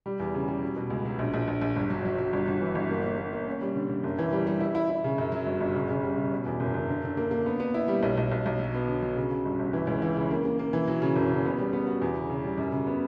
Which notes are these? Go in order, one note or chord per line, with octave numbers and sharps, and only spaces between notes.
G3
E2
C#3
G3
F#3
B2
C#2
F#3
A#1
A#1
A#1
A#1
G1
F#3
F#3
F#3
G1
G1
E3
G1
A#3
A#3
A#3
A#3
C#4
G3
D3
D3
F#1
E3
G3
G3
E4
E4
E4
C#3
F#2
F#3
G1
G1
C#3
C#3
G3
C#3
B2
E2
F#1
F#1
D3
D3
A#3
A#3
B3
B3
E4
G3
B1
B1
B1
B1
F#3
B3
D3
F#3
C#3
C#3
G1
G1
E3
C#2
E3
C#3
A#3
A#3
A#3
E3
F#3
C#3
F#1
C#3
B3
G3
B3
F#4
E2
C#3
C#3
G3
F#2
C#3
B3